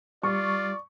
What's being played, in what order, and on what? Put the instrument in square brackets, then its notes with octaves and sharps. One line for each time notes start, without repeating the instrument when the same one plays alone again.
[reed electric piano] G3 [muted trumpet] F4 [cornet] D5 [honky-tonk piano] C#6